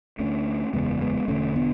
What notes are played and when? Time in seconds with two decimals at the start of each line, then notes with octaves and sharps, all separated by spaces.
0.19 D2 D3 A3 C#4
0.73 F#1 E2 C#3 G#3 B3
1.01 G#3 B3
1.28 E1 E2 D3 A3 C#4
1.56 B3 D4